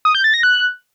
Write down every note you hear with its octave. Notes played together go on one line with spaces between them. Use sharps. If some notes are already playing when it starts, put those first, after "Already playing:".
D#6
G6
A6
A#6
F#6